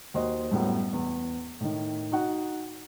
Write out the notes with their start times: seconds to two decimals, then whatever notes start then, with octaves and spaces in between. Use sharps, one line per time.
0.14 D#2 F#4 C5 D#5
0.51 F#2 A2 F#3 G3 B3
0.93 E2
1.60 A2 D#3
2.12 D#4 F#4 F#5